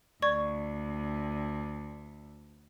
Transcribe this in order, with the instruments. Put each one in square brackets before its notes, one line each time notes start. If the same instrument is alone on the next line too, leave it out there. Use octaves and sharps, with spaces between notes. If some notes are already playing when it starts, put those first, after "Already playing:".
[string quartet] D2 [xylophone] D5 C#6 G#6